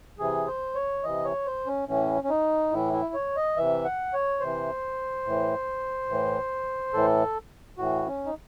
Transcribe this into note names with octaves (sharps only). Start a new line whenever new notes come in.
C3 E3 G#4
C5
C#5
C3 E3 D#5
C#5
C5
C#4
A2 E3 C#4
C#4
D#4
A2 E3 E4
E4
C#5
D#5
C3 E3 E5
F#5
C#5
C3 E3 C5
A2 E3
A2 E3
A2 E3 A4
A2 E3 F#4
C#4
D#4